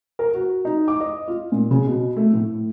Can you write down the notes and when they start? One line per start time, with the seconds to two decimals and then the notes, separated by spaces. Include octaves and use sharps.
0.19 A#4
0.34 F#4
0.65 D#4
0.88 D6
1.00 D#5
1.28 F4
1.52 A#2
1.71 C#3
1.87 B2
2.16 A3
2.33 A2